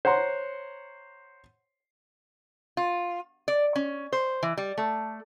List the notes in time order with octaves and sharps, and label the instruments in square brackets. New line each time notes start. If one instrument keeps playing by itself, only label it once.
[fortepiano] C5 C#5 F#5 A#5 C6
[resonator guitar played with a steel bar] F4
D5
C#4
C5
E3
G3
A3